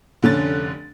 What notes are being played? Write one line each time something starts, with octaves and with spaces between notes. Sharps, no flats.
F1 D3 C#4 A6